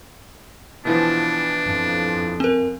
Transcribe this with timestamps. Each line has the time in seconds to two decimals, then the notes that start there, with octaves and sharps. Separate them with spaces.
0.85 B2 E3 F3 D4
1.65 F2
2.40 C4 A#4